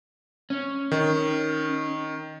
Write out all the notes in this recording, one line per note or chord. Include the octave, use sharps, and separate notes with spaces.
C#4
D#3